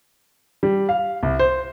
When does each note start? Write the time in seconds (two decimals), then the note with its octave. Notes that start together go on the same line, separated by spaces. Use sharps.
0.63 G3
0.89 F5
1.23 C2
1.39 C5